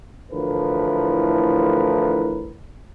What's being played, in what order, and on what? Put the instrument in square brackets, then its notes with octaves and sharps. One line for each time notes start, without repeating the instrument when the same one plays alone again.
[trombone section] D2 A2 E3 F3 A#4 B4